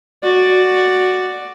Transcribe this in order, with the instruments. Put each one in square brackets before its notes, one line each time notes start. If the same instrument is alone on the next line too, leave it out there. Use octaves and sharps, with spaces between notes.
[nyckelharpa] F#4 D5